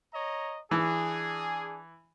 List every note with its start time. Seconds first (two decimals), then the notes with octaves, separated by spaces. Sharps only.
0.13 C#5 D#5 A#5
0.71 E3 D4 G#4